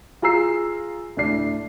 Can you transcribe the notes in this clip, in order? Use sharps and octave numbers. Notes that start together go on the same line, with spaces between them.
F4 G#4 A#5 E6 C7
D2 A2 D4 C7